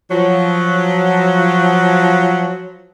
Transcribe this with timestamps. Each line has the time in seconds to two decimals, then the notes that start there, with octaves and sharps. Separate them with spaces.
0.10 F3 F#3